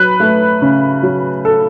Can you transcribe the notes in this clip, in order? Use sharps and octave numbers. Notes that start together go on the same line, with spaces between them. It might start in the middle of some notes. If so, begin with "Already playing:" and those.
Already playing: F#3 B4
A3
C#3
F#3
A4